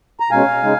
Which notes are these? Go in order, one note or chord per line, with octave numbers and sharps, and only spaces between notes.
A#5
B2 G#3 C#4 F5 G#5
C#3 G#3 D#4